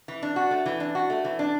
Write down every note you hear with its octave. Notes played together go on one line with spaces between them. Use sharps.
E3
D4
F#4
A3
E3
D4
F#4
A3
E3
D4